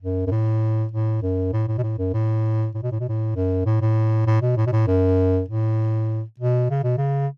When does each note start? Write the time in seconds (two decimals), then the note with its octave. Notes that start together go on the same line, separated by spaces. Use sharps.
0.01 F#2
0.27 F#2
0.31 A2
0.92 A2
1.22 F#2
1.53 A2
1.68 A2
1.78 B2
1.83 A2
1.98 F#2
2.14 A2
2.74 A2
2.83 B2
2.92 A2
3.00 B2
3.09 A2
3.36 F#2
3.66 A2
3.81 A2
4.27 A2
4.42 B2
4.57 A2
4.67 B2
4.72 A2
4.87 F#2
5.48 A2
6.39 B2
6.70 C#3
6.84 B2
6.97 C#3